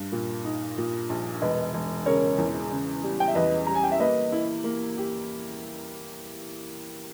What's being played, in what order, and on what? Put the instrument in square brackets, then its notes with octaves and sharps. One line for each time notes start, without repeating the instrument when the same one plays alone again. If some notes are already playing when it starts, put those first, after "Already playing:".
Already playing: [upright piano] G2
A#2
D#4
A#2
A#1
[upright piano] E1 [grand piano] B4 D#5
[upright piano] E1
[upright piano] C#3 [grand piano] A#4 C#5
[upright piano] E2
C#3
G3
[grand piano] G5
E5
[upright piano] E2 [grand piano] B4 D#5
[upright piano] G3 [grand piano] A#5
[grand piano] G#5
G5
E5
[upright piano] A#3 [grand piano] B4 D#5
[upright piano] E4
A#3
G4